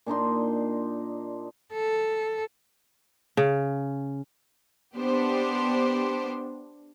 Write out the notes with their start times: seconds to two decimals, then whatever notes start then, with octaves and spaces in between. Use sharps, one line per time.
0.06 A#2 D4 D#4 C6
1.73 A4
3.37 C#3
4.95 B3 D4 G4 C5